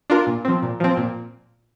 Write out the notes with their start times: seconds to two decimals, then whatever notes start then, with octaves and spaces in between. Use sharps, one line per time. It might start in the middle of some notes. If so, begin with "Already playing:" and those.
0.10 D4 F4 A#4
0.27 A#2
0.45 F3 C4
0.62 A#2
0.80 F3 C4
0.97 A#2